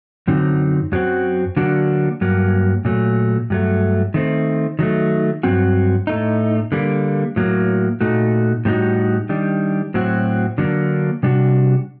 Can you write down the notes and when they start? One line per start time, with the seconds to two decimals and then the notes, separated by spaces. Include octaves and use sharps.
0.28 F#2 D3 F#3 C4 D#4
0.92 F#2 F#3 C4 F#4
1.57 D3 F#3 A#3 D4 F#4
2.21 G2 F#3 A#3
2.85 A#2 F#3 A3
3.50 G2 F#3 A3
4.14 D#3 A3 C4
4.79 D#3 F#3 A3
5.43 G2 F#3 C4 F#4
6.07 A2 A3 D#4
6.72 D3 G3 A#3
7.36 A2 F#3 A#3
8.01 A#2 A3 D#4 F#4
8.65 A2 G3 C4 D#4 F#4
9.29 D#3 G3 D4
9.94 A2 F#3 C4 F#4
10.58 D3 F#3 A#3 D4
11.23 C3 G3 D4 F#4